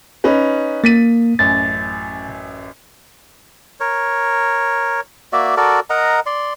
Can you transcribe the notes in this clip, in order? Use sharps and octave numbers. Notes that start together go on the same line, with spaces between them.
C#4 D#4 B4
A#3 A6 B6 D#7
A1 F#2 A6
A#4 C#5
A#3 F#4 D5 E5
F#4 A4 A#4 D5
A#4 D#5 F#5 A#5
D5 C6